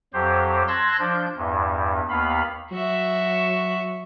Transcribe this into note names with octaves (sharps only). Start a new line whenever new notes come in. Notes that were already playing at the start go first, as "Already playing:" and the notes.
F2 F#3 G4 C5
A5 C6 E6 F#6 G#6 A#6
F3 D4 G6
E2 G2
D#2 B3 F5 B5
F#3 F#4 E5